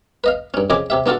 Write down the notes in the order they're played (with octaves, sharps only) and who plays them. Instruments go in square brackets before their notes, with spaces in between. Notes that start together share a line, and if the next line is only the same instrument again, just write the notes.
[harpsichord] B4 D#5 F5
G2 C#4
F2 C#3 D#5 G#5 B5 D6
C3 G4 E5
B3 D4 F4 F#4 A4